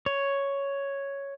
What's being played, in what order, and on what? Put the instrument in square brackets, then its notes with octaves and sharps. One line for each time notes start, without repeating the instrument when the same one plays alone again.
[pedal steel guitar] C#5